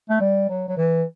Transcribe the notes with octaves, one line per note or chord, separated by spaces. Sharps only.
A3
G3
F#3
F#3
E3